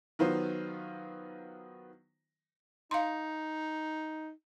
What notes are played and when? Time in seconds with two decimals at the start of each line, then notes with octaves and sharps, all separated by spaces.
0.19 D#3 F#3 B3 F4 C5
2.91 D#4 F5 C6